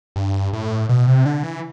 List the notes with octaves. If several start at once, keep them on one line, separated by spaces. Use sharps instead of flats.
G2
A2
B2
C3
D3
E3